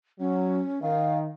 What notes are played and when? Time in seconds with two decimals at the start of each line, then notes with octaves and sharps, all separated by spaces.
0.20 F#3 C#4
0.82 D#3 F5